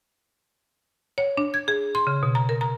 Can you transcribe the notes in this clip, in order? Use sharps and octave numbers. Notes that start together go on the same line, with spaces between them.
C#5
D4
G#6
G#4
C6
C#3
B2
A#5
A#4
A#5